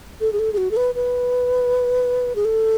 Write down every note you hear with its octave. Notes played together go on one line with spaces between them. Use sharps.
A4
G#4
A4
G#4
F#4
A4
B4
B4
G#4
A4